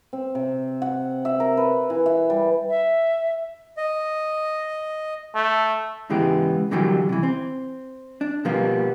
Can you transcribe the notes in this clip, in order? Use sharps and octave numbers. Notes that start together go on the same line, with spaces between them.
C4
C3
F#5
E5
A#4
B4
E3
E5
G3
E5
D#5
A3
G#2 C#3 E3 G#3 B3 G4
A#2 D3 E3 F#3 G3 A#3
C3 E3
C4
D4
B2 F3 G3 A#3 B3